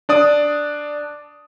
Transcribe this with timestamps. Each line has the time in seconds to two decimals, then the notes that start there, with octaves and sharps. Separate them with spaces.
0.09 D4 D5 D#6